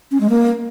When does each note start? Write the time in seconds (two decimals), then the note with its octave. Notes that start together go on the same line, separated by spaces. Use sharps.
0.11 C#4
0.20 G#3
0.30 A#3